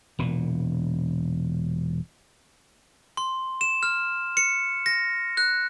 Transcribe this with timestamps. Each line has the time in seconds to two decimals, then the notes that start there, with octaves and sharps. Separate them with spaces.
0.19 E1 A#2
3.17 C6
3.61 E7
3.83 F6
4.37 C#7
4.86 A#6
5.37 F#6